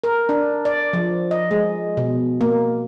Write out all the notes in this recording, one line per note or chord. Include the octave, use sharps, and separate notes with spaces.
A#4
D4
D5
F3
D#5
G#3
B2
A#3